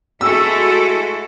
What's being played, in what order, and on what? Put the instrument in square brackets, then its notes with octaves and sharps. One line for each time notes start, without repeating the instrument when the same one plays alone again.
[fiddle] G#3 A3 [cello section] E4 F#4 A4 [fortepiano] E6